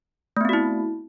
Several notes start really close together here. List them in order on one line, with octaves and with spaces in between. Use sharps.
A3 B3 C4 F#4 E4